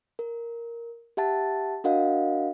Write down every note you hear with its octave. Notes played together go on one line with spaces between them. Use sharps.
A#4
G4 E5 F#5 A5 A6
D4 F#4 A#4 D#5 F5 F#5